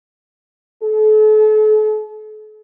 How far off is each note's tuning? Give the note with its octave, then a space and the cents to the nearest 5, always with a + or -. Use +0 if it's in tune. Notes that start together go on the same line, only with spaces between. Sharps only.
A4 -40